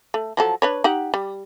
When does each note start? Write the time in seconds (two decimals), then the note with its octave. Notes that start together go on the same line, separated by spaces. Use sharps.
0.14 A3
0.37 F3 F#3 A4
0.62 D4 B4 C#5
0.84 D#4 G4 F#5
1.14 G3